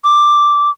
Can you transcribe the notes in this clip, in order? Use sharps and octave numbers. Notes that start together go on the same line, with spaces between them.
D6